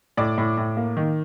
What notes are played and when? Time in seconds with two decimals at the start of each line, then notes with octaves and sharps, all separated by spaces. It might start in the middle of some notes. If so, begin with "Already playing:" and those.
0.17 A2 D5 D6
0.38 A2
0.57 A2
0.77 A#3
0.97 D#3